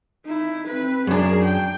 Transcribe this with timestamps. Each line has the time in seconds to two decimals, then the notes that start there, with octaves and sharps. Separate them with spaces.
0.25 D#4 E4
0.68 C4 B4
1.07 F#2 D4 G#4 A#4
1.44 G5